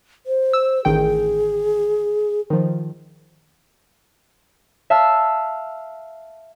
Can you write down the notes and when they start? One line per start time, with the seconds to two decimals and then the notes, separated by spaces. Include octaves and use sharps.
0.26 C5
0.53 E6
0.85 A1 D#3 G#4 G5
2.50 D#3 F3
4.90 E5 F5 A5 E6